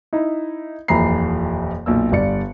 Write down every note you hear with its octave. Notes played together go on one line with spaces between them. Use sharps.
D#4 E4
D#1 F2 E3 A#5 B5 C7
B1 A#2 E6
G1 G2 D5 C#7